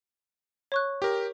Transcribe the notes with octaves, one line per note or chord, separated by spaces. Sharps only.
C#5 C#6 F#6
G4 A#4